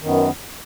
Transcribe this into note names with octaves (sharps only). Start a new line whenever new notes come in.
F#2 D#3 B3